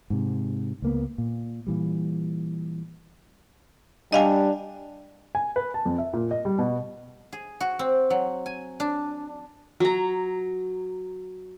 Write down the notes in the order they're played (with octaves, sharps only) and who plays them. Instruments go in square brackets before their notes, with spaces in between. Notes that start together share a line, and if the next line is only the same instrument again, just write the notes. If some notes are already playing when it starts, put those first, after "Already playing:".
[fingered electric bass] G#2 C3
C#2 A#3 B3
A#2
A#2 E3 G3
[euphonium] G3 [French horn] D4 [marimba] D#5 F5 G#5
[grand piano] G#5
B4
A5
F2
E5
A#2
D#5
G3
B2
[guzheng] G#4
F#4
C4
F#3
G#5
D4
[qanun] F#3 A#5